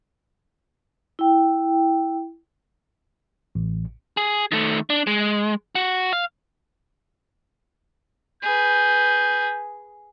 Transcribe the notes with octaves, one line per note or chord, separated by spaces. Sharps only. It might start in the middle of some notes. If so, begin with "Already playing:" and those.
E4 G5
A1
G#4
D#3 A3
D4
G#3
F#4
F5
G#4 B4 G6